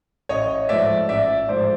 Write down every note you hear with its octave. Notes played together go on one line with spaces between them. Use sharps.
A1 C#5 D#5
G#2 F3 A3 D5 E5
A1 D5 E5
G#2 F3 A3 C5 D5